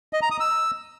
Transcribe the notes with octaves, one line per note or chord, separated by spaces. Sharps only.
D#5
A#5
D#6
E6